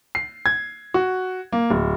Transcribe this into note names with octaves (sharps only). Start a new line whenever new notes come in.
C7
G#6
F#4
A#3
D1